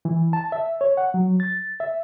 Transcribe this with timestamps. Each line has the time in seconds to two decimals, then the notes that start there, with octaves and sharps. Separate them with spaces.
0.05 E3
0.33 A5
0.52 E5
0.81 C#5
0.97 F#5
1.14 F#3
1.40 A6
1.80 E5